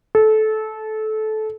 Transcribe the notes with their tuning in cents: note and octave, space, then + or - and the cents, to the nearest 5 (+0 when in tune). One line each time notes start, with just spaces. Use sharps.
A4 -20